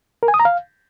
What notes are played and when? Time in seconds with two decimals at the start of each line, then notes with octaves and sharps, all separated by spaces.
0.23 A#4
0.28 G#5
0.34 D#6
0.40 A#5
0.45 F5